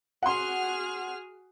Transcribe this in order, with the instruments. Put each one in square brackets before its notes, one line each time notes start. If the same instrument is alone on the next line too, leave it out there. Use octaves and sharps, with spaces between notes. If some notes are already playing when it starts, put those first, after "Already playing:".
[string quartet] F#4 G#4 F6 [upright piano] F#5 C6